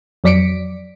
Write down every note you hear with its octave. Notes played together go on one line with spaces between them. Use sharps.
F2 F#3 D5 B6 C#7 D7